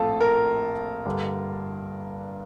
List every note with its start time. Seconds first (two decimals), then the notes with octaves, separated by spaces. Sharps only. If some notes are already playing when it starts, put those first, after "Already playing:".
Already playing: A#1 A2 F3 A3 C4 F4 A4
0.21 A#4
1.05 G2 D3 G3 D4